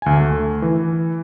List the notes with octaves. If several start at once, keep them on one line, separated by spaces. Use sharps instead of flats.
D2 G#5
A3
E3